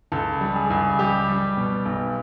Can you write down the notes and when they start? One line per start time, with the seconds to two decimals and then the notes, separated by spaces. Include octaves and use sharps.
0.12 C#2 A4
0.41 G3
0.56 G#4
0.70 C#2
0.99 G3 G4
1.28 G3
1.57 B2
1.86 B1